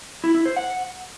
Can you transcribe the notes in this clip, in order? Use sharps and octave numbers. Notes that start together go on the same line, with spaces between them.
E4
E4
C5
F#5